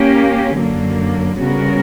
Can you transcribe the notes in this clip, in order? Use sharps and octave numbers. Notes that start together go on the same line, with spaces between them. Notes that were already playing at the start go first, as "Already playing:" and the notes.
Already playing: A#3 C#4 G4
F#2 D3 F#3 A#3
C#3 G3 B3 F#4 A#4